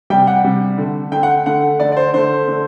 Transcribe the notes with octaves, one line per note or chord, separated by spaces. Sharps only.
C3 G3 G5
F#5
C3 G3
D3 A3
D3 A3 G5
F#5
D3 A3 F#5
D3 A3 D5
D5
C5
D3 A3 C5
D3 A3